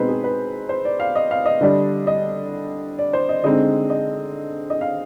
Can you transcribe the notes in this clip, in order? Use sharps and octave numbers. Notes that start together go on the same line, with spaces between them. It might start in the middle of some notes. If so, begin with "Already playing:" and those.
Already playing: B2 G#3 C4 D#4 B4 C5
G#4
B4
C5
D5
F5
D#5
F5
D#5
D3 G3 D4
D#5
D5
C5
D#5
D3 G#3 C4 D#4 D#5
D#5
D#5
F5